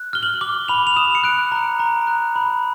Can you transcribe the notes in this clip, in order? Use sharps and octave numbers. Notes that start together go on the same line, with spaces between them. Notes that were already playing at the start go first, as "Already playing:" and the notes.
Already playing: F#6
F6 G7
F#7
D6 F#7
B5 F7
F7
D#6 E7
C#7
F#6 D7
A#5
A#5
F#6
B5